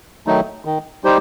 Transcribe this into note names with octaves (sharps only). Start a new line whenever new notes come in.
D#3 F#3 A3 D#4
D#3
G3 D#4 G4 C5